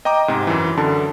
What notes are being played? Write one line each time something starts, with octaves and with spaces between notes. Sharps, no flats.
D#5 G5 A#5 D6
G#2 C3 G#3
F#2 E3
F#2 D3 A5